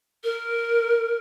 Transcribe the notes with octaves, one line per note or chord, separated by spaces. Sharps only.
A#4